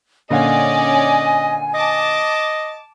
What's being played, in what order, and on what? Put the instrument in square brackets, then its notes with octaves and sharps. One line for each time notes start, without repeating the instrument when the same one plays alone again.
[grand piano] A#2 D3 F5 [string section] C#4 D5 [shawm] D#5 [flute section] G#5
[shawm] D#5 [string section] A5 D6